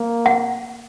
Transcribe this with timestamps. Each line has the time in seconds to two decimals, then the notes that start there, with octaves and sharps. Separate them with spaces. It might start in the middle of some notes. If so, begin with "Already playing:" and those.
Already playing: A#3
0.26 F#5